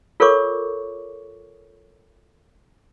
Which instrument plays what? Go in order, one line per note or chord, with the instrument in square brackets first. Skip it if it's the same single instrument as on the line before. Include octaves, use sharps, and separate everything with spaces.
[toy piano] F4 A4 A#4 C#5 C#6 D6